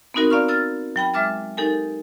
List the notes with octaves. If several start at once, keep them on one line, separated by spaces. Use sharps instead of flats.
B3 C4 D#4 F#4 A#4
D5 F5 A#5 C#6 F6
E6 F6 A6
F#3 G5 B5
G#3 E5 D6 F6 A6
D#4 G4 A4 A#4 G#5